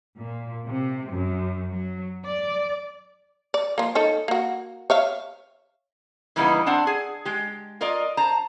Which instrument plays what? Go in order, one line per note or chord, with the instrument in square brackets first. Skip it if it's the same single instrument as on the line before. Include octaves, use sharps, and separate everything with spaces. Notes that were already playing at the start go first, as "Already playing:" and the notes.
[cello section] A#2
C3
F#2
F#3
D5
[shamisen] D5
F3 A#3
D#4 A4 C#5
A#3 F#4
C#5 E5 F5
[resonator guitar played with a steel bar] C#3 E3 G3 A#3 B3 D#4
C4 D4 F#5 A5
G#4
G#3 G4
F4 A#4 D5 D#5
C5 A5 A#5